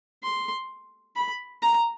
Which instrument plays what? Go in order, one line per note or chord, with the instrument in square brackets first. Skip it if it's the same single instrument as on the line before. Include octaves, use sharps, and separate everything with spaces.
[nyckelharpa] C6
B5
A#5